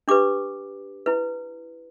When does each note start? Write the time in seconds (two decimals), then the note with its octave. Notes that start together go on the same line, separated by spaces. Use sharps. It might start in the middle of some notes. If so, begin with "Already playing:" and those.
0.08 D4 G4 B4 D6
1.06 E4 B4